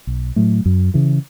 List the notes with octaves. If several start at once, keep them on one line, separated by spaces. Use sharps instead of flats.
B1
A2 F#3 A3
F#2
C#3 E3